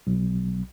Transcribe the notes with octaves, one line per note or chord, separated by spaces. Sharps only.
B1